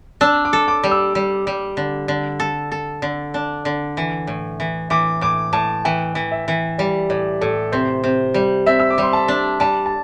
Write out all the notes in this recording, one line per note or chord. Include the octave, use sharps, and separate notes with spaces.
D4 E6
D6
A4
D6
G3
E6
G3
G3
D3
D3
A4
A4
D3
D4
D3
E3
A2
E3
E3 D6
A2 D6
A2 A5
E3 G5
E3
E5
E3
G3 D5
A2 D5
A2 A4
C3 C5
C3
G3
C3 E5
E6
D6
G3 C6
A5
D4
G3 A5
A5